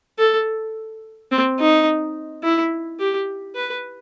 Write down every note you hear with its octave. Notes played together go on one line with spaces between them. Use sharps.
A4
C4
D#4
E4
G4
B4